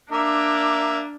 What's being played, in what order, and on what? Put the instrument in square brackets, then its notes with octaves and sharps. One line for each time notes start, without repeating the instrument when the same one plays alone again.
[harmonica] A#3 E5 [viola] D4